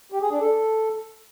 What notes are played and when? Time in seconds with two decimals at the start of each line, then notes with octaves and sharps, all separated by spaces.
0.12 G4
0.22 G#4
0.31 D4
0.41 A4